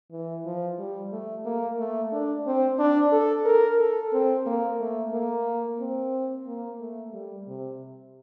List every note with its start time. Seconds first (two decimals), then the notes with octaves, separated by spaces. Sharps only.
0.11 E3
0.46 F3
0.79 G3
1.12 A3
1.46 A#3
1.79 A3
2.12 D4
2.46 C4
2.79 D4
3.12 A4
3.45 A#4
3.79 A4
4.13 C4
4.46 A#3
4.80 A3
5.13 A#3
5.80 C4
6.46 A#3
6.80 A3
7.13 G3
7.48 C3